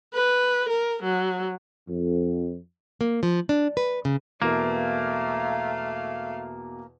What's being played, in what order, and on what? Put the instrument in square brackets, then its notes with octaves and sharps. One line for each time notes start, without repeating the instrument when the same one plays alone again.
[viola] B4
A#4
F#3
[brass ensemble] F2
[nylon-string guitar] A#3
F3
D4
B4
C#3
[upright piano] E2 B2 A#4 [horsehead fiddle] A3 F5 [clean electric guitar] A#3